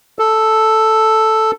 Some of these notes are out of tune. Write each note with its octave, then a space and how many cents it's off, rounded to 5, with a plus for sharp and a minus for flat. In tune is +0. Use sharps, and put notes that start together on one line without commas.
A4 +0